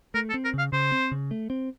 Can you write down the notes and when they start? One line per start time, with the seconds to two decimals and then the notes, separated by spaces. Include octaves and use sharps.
0.14 A3 A#4
0.29 A4
0.34 C4
0.44 A#4
0.54 C#3 F5
0.72 C#3 C5
0.92 C4
1.12 C#3
1.31 A3
1.50 C4